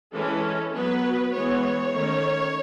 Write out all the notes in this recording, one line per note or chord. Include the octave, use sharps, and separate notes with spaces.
E3 G#3 C#4 A4
F#3 B3 B4
E3 G#3 B3 C#5
D#3 A3 C#4